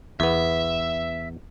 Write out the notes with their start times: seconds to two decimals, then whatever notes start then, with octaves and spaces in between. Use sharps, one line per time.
0.20 E2 B3 E5